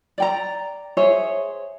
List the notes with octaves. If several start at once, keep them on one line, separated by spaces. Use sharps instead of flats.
D5 G5 A#5
G#4 C5 C#5 E5